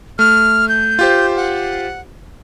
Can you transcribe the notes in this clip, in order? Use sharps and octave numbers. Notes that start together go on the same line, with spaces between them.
A3 F6
G6
F4 G4 C5
F#5